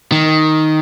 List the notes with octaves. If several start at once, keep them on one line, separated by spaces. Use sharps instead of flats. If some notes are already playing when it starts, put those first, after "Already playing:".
D#3